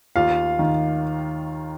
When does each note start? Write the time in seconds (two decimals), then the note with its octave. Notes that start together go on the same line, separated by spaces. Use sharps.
0.16 D#2 F4 F5
0.59 D#3